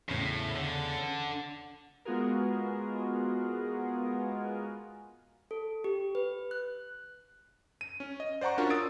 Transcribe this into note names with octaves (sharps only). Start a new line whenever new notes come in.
E2 A2 C#3 C#4
D3
G#3 B3 F4 F#4 G#4 A#4
A4
G4
B4
F#6
D#7
C#4
D#5
C5 D5 F#5 A#5 C#6
C#4 D4 F4 F#4 A#4
D#6 E6 A6 D7